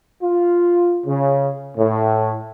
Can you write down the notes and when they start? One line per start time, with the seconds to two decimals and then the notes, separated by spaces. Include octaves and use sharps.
0.22 F4
1.06 C#3
1.78 A2